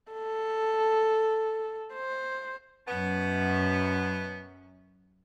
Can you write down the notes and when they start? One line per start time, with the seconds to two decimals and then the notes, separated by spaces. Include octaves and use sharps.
0.12 A4
1.94 C5
2.87 F#2 B2 F#3 B3 C#4